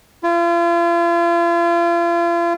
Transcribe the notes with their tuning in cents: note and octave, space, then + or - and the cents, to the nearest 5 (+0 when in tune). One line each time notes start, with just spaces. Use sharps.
F4 -40